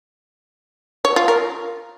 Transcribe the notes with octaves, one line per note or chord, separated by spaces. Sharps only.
C#5
F4
A#4